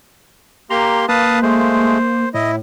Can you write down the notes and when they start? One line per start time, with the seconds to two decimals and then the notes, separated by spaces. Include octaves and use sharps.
0.70 A#3 G4 A#5 C6
1.09 A#3 B4 F5 A5 D#6
1.42 G#3 A3 C5
2.34 A2 E4 D#5